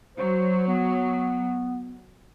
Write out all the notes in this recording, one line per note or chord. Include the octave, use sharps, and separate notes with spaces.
F#3 C5
B3